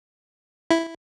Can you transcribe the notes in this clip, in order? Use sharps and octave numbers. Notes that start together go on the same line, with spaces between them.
E4